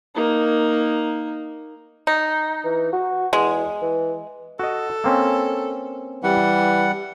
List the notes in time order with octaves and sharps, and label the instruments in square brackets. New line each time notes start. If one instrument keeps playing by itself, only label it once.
[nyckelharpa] A#3 D#4
[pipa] D#4
[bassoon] E3
F#4
[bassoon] E2 [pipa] G#3
[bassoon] E3
[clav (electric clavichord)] F#4 D#5 [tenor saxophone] A4
[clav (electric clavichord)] A#3 C4 C#4
[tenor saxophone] E3 [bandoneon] G3 F#5